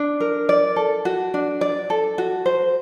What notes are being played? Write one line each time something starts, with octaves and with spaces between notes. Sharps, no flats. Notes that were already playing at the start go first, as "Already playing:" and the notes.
Already playing: D4
A#4
D5
A4
F#4
D4
D5
A4
F#4
C5